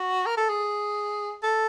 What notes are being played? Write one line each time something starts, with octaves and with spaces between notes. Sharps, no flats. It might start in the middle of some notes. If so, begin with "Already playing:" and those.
Already playing: F#4
A#4
A4
G#4
A4